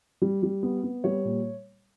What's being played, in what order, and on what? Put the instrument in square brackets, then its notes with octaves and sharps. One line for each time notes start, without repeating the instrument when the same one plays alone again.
[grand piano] G3
G3
B3
B3
G3 C#5
A#2